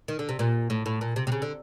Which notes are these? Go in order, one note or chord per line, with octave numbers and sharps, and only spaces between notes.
D#3
D3
C3
A#2
A2
A2
A#2
C3
C3
C#3
D3